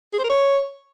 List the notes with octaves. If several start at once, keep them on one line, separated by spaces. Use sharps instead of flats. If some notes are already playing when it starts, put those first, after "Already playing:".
G#4
C5
A#4
C#5